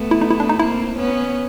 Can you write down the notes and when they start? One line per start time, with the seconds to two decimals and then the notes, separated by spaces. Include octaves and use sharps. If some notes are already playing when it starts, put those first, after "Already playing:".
Already playing: A3 B3
0.11 E4
0.21 D#4
0.31 E4
0.40 D4
0.49 D#4
0.59 A#3 C4 E4
0.98 B3 C#4